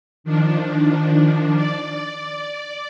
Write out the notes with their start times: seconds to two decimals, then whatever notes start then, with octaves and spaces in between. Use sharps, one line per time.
0.24 D#3 F3 D4
1.53 D5